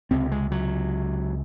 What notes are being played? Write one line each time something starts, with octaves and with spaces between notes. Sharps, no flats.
C#2 C3 C4
G#3
F#3